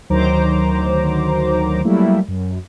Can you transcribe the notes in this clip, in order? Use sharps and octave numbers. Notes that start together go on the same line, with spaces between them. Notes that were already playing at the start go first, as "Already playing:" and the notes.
D2 D#3 F#3 C5 A#5 D6
F#3 G3 A3 A#3 E4
F#2